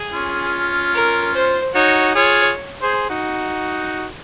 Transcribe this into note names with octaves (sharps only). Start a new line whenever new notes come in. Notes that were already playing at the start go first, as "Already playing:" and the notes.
Already playing: G#4
C#4 F4
A#4
C5
D#4 F#4 C#5
F4 G#4 C#5
G#4 C5
D#4 F#4